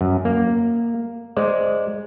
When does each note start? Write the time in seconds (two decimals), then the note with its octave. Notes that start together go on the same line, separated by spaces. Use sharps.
0.01 F#2
0.25 A#3
1.37 G#3 C5 D5